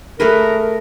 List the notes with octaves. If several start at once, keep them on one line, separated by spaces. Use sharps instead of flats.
A3 G#4 A#4 B4